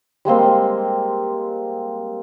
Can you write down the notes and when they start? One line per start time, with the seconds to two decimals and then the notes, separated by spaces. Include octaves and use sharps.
0.25 G3 G#3 A#3 C4